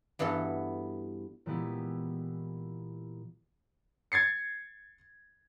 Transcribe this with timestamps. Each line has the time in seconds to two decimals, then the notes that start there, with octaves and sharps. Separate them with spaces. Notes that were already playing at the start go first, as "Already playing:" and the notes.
0.19 G2 E3 B3 F#4 A4
1.46 A#2 E3 G#3 B3 E4 G4
4.12 G#6 A6 C7 C#7